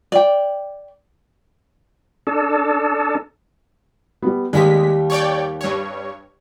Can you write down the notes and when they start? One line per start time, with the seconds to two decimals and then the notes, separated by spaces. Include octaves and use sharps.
0.12 D5 G5
2.27 D4 A4
4.22 G3 B3
4.53 D#2 G3 G#3 G4 B6
5.10 C#5 D5 G5
5.61 G2 C#5